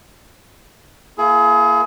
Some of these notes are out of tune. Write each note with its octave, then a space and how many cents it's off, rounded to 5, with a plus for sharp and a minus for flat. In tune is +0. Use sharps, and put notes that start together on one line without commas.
A#3 +0 E4 +30 G#4 +30